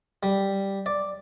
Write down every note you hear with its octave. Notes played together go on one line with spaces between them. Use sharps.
G3
D5